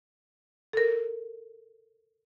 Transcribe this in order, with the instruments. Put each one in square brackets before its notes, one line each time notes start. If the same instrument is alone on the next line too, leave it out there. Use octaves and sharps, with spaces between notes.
[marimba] A4 A#4